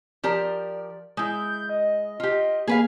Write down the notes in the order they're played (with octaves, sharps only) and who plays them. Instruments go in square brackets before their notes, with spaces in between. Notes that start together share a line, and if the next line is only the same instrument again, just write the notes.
[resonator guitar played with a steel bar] F3 G4 A#4 [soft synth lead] D5
[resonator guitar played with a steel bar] G#3 E4 [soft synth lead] G6
[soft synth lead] D#5
[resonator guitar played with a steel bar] F4 G4
[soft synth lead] A#3 [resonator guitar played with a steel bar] G#4 B4 F5